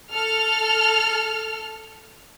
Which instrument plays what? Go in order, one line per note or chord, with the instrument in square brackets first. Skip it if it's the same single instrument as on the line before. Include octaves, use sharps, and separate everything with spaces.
[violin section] A4 F6